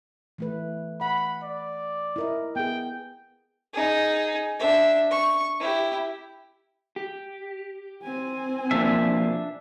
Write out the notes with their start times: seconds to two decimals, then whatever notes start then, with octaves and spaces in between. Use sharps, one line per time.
0.38 E3 A3 B4
1.01 F#5 B5
1.43 D5
2.16 E4 A#4 D#5
2.56 B3 G#4 G5
3.74 D#4 G#4
4.59 D4 E5
5.11 C#6
5.59 E4 G4
6.96 G4
8.03 C4 G#5
8.71 B2 F3 A#3 D4 E5